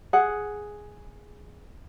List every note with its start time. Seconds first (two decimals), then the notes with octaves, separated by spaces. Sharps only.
0.13 G#4 F#5